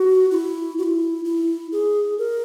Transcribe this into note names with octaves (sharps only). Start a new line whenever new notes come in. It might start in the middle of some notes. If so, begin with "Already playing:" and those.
Already playing: F#4
E4
F#4
E4
E4
G#4
A#4